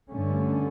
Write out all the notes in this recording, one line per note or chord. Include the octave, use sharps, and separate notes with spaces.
G2 D3 A3 C#4